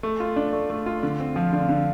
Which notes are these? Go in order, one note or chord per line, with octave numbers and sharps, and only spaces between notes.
A3
F4
D4
A3
A3
F4
D3
C4
F3
D3
D3